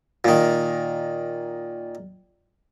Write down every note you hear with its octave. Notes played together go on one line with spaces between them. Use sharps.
A#2 D#3